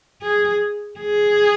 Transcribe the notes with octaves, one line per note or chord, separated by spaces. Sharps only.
G#4
G#4